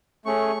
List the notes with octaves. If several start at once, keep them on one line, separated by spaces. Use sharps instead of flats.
A3 C#4 G#4 C#6